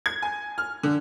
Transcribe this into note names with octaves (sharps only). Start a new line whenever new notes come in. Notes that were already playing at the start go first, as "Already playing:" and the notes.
G#6
G#5
F6
D3